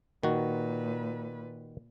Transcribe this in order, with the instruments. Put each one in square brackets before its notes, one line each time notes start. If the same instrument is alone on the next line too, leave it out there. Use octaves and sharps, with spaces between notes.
[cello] A#2 B4 [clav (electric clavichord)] D#3 F#4